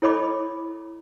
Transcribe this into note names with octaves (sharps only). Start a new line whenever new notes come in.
E4 A4 C#5 D#5 B5 D6